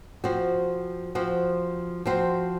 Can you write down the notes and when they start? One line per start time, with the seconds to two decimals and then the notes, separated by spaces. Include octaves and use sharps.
0.24 F3 C4 F#4 C5
1.15 F3 C4 F#4 C5
2.06 F3 C4 F#4 C5